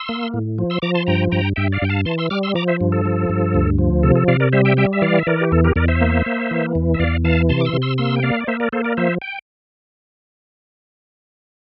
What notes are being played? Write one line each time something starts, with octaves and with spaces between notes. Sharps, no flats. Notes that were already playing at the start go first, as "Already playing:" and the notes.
Already playing: C6 E6
A#3
A2
F3
C6 E6
F3 A#5 D6
A5 C6
G2 G5 A#5
G2 G5 A#5
G2 E5 G5
D5 F5
G2 G5
F5 A5
E3 A5 C6
C6 E6
G3 D6 F6
C6 E6
F3 A#5 D6
C5 E5
G2
A4
F3
G2
D2
F3
C3 A4
A4
C3 D5 F5
A#4 D5
G3 C5 E5
E5 G5
G3 E5 G5
E5
E3 D5 F5
E5
E3 A#4 D5
G4
E2 A4
G4 A#4
E2 A#4 D5
C5 E5
A#3
A#3
E3
E2
E5
E2 D5 F5
E3 F5 A5
C3 A5 C6
D6
C6 E6
C3
C6 E6
A#3 C6 E6
G5
A#3 D5 F5
D5
A#3 C5 E5
A#4 D5
A#3 A4 C5
A#4 D5
F3 C5 E5
G5